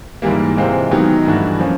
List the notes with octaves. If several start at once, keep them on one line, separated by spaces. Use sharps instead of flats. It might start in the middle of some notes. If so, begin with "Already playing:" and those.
G#2 E3 G3 A#3
C3 E3 G#3 C4 F4
D#3 F#3 B3 D#4 G4
G2 E3 A3 D4 F#4
F3 A#3 C#4